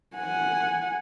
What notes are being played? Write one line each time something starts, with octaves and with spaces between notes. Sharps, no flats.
F#5 G#5